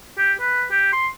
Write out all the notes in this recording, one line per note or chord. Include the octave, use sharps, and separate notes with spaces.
G4
B4
G4
C6